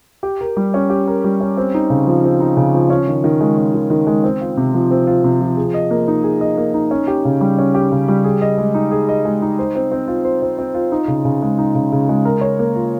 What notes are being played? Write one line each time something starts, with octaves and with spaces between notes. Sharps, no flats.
G4
A#4
G3
C#4
G4
A#4
G3
C#4
C4
D#4
C#3
F3
C4
D#4
C#3
F3
C#4
D#3
D#3
G#3
C#4
D#3
D#3
G#3
C4
F4
C3
F3
C4
F4
C3
F3
G#4
D#5
A#3
D#4
G#4
D#5
A#3
D#4
C#4
G4
C#3
G3
C#4
G4
C#3
G3
G#4
D#5
G#3
D#4
G#4
D#5
G#3
D#4
C5
C4
C4
F4
C5
C4
C4
F4
D#4
C#3
C#3
G#3
D#4
C#3
C#3
G#3
A#4
C#5
A#3
F4